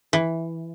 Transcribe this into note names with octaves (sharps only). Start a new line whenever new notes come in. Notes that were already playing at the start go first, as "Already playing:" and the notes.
E3